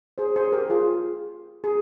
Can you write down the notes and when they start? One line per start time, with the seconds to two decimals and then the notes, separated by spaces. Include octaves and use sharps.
0.18 G#4 C5
0.36 G#4 C5
0.52 G4 A#4
0.70 F4 G#4
1.64 G#4